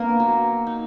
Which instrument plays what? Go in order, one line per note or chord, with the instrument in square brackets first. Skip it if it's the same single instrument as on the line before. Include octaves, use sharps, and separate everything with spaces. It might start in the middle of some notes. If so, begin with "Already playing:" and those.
Already playing: [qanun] A#3 B3 D4 A#4
F#3
D#4